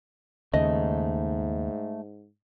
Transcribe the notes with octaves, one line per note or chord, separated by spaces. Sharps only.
D#2 G#2 C#3 A3 D#5